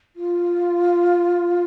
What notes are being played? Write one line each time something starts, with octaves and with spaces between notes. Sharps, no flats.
F4